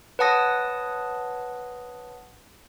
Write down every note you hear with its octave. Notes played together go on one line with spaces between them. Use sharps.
B4 C#5 F#5 A5 D#6 A#6